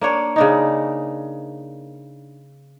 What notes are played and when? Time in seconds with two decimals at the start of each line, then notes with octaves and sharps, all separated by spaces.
0.01 A#3 D4 C#5
0.36 C#3 D4 D#4